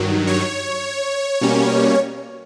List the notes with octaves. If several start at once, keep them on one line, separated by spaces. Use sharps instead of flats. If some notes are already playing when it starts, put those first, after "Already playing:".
Already playing: G2 D#3 F#3
C#5
B2 G3 A#3 C#4